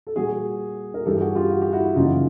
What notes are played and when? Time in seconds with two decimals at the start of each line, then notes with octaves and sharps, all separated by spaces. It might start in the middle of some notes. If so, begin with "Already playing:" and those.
0.07 A4
0.16 A#2 G3 A#3 F#4 G#4
0.94 A#4
1.06 G2 E3 G3 G4 A4
1.16 G4
1.20 F#4 G#4
1.35 F4 G4
1.50 F#4
1.61 G4
1.73 E4 F#4
1.95 F#2 C#3 E3 G3 A#3 D#4 F4